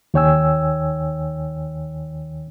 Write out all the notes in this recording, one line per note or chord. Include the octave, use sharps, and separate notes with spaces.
D#2 D#3 C#5 G5 G#5 E6